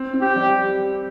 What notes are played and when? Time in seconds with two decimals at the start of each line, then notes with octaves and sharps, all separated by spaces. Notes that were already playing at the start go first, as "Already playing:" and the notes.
Already playing: C4
0.14 C4
0.21 G4
0.36 G3